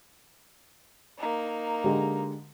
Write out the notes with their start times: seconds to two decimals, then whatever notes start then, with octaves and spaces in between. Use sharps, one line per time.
1.18 A#3 D#4
1.84 D3 G#3 G4